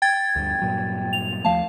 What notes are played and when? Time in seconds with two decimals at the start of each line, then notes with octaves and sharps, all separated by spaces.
0.02 G5 G#6 A6
0.36 D2 G2
0.62 G2 A#2 F#3
1.13 F7
1.45 D#2 F3 A3 F5 A5